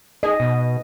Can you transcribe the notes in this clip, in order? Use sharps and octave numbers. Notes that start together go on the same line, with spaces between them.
G#4 D#5
B2